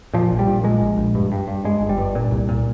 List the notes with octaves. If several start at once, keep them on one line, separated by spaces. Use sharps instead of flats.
A#2 F3
A#1
G3
A#2
A#2 G#3
A#1
A#1
G2
G2
G2
G2 G#3
G1
G3
G2
A#2
C2
A#2